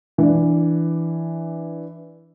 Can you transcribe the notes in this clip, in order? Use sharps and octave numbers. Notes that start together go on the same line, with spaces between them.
E3 D4